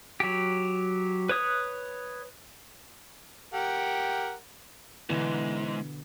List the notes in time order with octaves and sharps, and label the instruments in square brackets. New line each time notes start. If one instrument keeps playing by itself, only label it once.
[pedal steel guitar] F#3 G4
B4 C#5 D#6 F#6
[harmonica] G4 A#4 F#5
[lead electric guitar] D2 G#2 [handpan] B2 D3 B3 [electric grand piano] E3